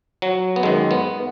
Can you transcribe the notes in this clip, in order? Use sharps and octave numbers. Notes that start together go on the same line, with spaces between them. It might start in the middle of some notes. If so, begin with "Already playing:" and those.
F#3
B3
F#2 D#3 G#3
B3